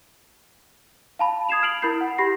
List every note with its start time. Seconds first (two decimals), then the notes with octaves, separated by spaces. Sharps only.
1.19 F5 A5 B5
1.49 D#6 G#6 C7 E7 F7
1.62 F6 C7 D7 F7 F#7
1.82 E4 A#4 B5 G6 C7
2.01 F#5
2.18 G4 B5 A#6 C7